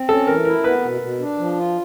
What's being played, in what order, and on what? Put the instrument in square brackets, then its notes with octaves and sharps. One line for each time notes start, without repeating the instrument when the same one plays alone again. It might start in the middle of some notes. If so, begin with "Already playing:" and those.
Already playing: [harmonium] C4
[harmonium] C#4 [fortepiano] A4
[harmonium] E3 [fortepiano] A#4
[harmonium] E4 [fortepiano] A#4
[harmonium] B3 [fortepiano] B4
[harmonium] B2
B2
D4
F3
F4